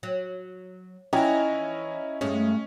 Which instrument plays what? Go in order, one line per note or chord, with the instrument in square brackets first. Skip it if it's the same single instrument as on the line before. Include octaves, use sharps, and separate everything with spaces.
[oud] F#3
[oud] E3 [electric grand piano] C#4 E4 [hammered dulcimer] D#5 G#5 A#5
[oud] G2 G#3 A3 [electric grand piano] C#4